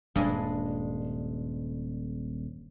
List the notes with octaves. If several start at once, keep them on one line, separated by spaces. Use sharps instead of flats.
D#1 G2 G#3 G#5